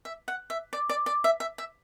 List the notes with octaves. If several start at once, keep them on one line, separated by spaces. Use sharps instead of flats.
E5
F#5
E5
D5
D5
D5
E5
E5
E5